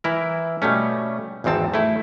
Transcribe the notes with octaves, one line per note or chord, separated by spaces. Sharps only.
E3 E4 A#4
B2 G3 A3 C#4
G#1 E2 G#2 C4 A5
A3 E4